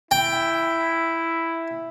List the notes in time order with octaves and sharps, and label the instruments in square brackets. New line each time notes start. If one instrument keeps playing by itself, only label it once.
[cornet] E4 [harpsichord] G5